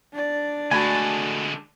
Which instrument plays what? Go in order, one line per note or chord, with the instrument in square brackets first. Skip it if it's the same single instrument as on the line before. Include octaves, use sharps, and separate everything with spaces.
[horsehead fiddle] D4 D5
[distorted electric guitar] D3 G#3 [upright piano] A3 F#4 B5 [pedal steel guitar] G#5 A5